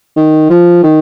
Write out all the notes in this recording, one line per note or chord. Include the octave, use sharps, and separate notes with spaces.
D#3
F3
D#3